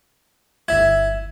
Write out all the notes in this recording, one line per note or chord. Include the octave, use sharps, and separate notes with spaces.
G1 E4 E5 G#6